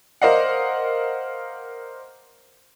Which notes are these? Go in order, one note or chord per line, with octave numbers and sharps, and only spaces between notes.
A#4 C5 D5 D#5 F5 F#5